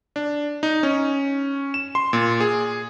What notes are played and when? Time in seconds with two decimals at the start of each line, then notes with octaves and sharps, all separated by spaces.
0.16 D4
0.63 D#4
0.83 C#4
1.74 E7
1.95 C6
2.13 A#2
2.40 G#4